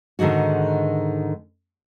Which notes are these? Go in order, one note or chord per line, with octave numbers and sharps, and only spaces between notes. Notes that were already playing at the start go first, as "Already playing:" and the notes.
G#2 D3 D#3 G#3 F#4